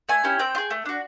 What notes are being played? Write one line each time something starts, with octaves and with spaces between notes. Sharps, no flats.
A3 G#5
C#4 E4 G4
C4 G5
F4
G#4
A3
D4 F#4